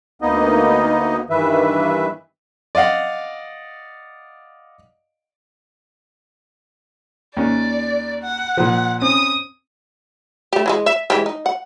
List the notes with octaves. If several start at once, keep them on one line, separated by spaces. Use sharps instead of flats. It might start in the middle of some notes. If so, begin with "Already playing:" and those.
D2 A#3 B3 D#4 D#5
G2 D#3 E3 B4 E5
D5 D#5 F5 F#5
D#2 C#4 D5
F#5
A#2 F3
C4 C#4 D#6
A3 G4
E3 G3 G#3
E5
E3 G#3 G4
D#4
F#5